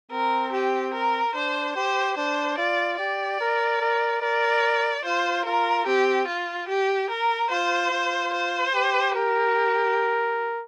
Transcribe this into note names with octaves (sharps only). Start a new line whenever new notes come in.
C4 A#4
G4
A#4
D4 C5
G4 C5
D4 C5
F4 D5
G4 D5
A#4
A#4
A#4 D5
F4 C5
F4 A#4
C4 G4
F4
G4
A#4
F4 C5
F4
C5
G4
G4 A#4